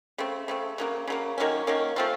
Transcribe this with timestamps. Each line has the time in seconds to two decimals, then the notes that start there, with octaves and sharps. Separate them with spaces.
0.18 C#3 A3 C4
0.48 C#3 A3 C4
0.78 C#3 F#3 A#3
1.08 C#3 F#3 A#3
1.38 D#3 F#3 A#3 C#4
1.67 D#3 F#3 A#3 C#4
1.96 F3 A3 C4 F4